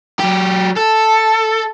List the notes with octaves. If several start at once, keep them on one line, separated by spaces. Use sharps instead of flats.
F#3 G4
A4